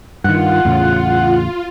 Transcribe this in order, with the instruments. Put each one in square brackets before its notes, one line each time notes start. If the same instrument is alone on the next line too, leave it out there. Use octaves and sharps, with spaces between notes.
[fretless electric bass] G2 D#3 [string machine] F4 [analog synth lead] F#5
[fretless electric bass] E2 A2 C#3